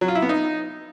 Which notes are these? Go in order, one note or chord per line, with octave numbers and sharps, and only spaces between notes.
F#3
F4
E4
B3
D#4